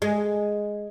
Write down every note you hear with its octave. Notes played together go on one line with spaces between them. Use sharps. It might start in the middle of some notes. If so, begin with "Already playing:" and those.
G#3